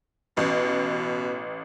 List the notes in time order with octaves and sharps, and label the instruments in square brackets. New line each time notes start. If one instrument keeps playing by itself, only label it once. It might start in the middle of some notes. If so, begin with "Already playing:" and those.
[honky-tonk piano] A1 [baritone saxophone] B2